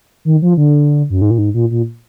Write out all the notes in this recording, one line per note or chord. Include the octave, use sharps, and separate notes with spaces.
D#3
F3
D3
F#2
G#2
A#2
G#2
A#2
A#2